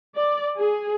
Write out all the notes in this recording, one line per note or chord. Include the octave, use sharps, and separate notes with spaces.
D5
G#4